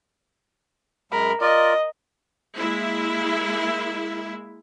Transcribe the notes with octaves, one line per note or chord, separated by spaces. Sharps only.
F#2 G#3 A#4 B5
F4 A#4 D5 D#5
G#3 A#3 E4